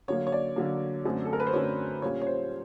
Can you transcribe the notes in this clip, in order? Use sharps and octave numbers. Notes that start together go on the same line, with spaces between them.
D3 F#3 A#3 C#5
C#5
D5
D3 F#3 A#3
F#2 D3 F#3 A3 C4
A4
A#4
B4
C5
F#2 D3 F#3 A3 C4 C#5
A#2 G3 A#3 C#4 C#5
C#5
C5